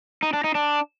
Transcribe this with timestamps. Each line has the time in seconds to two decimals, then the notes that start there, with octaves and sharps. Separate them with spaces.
0.23 D#4
0.33 D4
0.44 D#4
0.55 D4